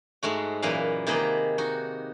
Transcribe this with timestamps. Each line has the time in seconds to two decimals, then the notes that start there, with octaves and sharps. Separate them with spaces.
0.23 G#2 G#3 A3 F#4
0.62 F#2 A#2 E3 B4 F5
1.07 C3 D#3 A#3 G#4 B4 D#5
1.58 D#4 F#4